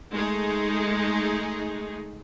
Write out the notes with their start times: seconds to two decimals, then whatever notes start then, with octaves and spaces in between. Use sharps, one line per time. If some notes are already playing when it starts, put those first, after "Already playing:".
0.13 G#3 A3 D#4 G#4